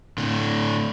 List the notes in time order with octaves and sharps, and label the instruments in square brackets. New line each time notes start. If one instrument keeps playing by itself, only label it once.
[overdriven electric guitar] A2 D3